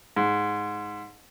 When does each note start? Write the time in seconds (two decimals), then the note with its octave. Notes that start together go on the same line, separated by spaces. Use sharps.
0.16 G#2